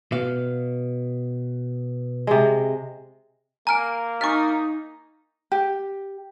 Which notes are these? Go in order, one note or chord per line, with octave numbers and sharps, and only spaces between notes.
B2 F5
C3 G#3
A#3 G#5 A#5 F6 D7
D#4 G#5 C#6 F6 A6 B6
G4